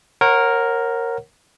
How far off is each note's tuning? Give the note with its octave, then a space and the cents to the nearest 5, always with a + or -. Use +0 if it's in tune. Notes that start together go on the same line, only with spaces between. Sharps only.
A#4 +0 C#5 -30 F#5 +0